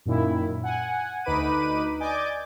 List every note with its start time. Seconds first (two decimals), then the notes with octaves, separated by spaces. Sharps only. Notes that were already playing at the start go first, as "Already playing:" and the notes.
0.05 F#2 A#2 D#3 E4
0.64 F#5 G#5
1.24 D2 D#4 B4 B5 D6 D#7
2.00 D5 D#5 G#5 D6 G6 A6